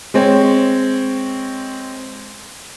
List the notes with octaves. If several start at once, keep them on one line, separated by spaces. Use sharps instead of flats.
G#3 C4 C#5